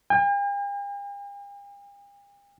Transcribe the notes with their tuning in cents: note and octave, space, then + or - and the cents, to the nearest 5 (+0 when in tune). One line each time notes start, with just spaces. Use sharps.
G5 +45